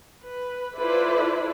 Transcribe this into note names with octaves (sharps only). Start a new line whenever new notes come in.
B4
E4 F4 A4 B4 C5 D5